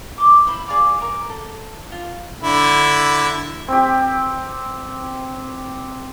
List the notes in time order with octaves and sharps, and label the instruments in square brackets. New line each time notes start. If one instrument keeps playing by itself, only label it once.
[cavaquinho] C6 D6
E4 C5 B5
G#4 D5 F5 D6
A#4 D6
A4
F4
[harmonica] D3 E4
[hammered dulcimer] C4 G4